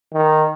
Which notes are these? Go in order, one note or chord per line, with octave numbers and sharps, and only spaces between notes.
D#3